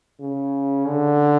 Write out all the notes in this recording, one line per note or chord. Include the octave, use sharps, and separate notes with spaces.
C#3
D3